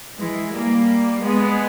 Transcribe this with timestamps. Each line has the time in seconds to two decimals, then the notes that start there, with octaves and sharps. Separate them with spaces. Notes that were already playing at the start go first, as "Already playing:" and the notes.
0.18 E3 G#3
0.53 G3 A#3
1.22 G#3 B3